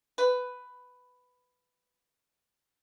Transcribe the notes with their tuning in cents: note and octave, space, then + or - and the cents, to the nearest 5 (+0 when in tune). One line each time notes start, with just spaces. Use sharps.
B4 +10